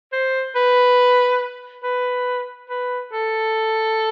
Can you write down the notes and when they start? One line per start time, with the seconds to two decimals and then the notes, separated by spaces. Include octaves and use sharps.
0.13 C5
0.55 B4
1.84 B4
2.70 B4
3.13 A4